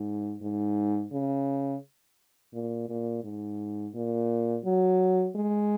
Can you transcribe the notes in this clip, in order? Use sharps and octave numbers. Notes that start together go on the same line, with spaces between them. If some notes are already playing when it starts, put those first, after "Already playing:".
Already playing: G#2
G#2
C#3
A#2
A#2
G#2
A#2
F#3
G#3